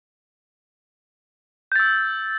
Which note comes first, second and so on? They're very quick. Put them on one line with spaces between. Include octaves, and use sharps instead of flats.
G6 A6 E6